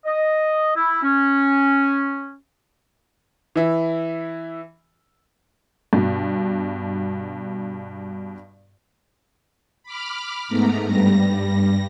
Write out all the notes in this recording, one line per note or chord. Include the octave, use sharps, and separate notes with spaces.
D#5
E4
C#4
E3 E4
G2 B2
B5 D6 F6
G#2 A3 B3 A#5
G2 G3 A#6